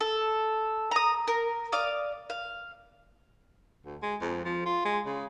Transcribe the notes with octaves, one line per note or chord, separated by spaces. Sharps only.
A4
A#5 D#6
A#4
D5 F5 D6 D#6
F5
D2
G#3
F2
F3
F4
G#3
C#3